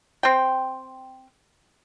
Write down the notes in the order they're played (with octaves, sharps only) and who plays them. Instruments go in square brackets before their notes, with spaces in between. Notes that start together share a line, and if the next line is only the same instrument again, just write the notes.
[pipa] C4 G5